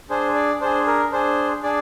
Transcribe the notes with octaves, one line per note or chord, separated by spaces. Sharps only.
D4 G#4 C5
D5
D4 G#4 C5
A#4
D4 G#4 C5
D4 G#4 D5